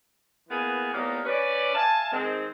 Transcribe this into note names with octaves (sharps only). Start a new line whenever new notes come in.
E3 A#3 B3 G#4 B4
A2 G3 A#3 B3 D#4
C#4 B4 D5
E5 F5 G#5 A5
G#2 D#3 G#3 C4